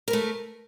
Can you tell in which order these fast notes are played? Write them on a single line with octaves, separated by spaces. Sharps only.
A#4 B4 A3